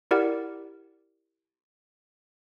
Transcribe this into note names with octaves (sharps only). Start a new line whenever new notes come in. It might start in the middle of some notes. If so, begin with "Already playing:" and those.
E4 G4 A#4 D5 F#5